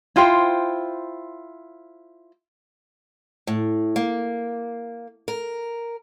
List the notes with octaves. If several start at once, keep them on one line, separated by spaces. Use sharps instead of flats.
E4 F4 C5 G5
A2
A#3
A#4